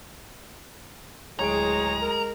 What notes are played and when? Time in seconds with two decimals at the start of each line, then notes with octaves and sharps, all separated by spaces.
1.39 D1 G#3 G#4 C#5 A#5 D7
2.02 A#4